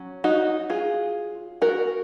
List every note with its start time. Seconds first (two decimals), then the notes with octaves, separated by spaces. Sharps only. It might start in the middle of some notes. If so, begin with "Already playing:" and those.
Already playing: F#3 C#4
0.24 D#4 F#4
0.70 F4 G#4
1.62 F#4 A#4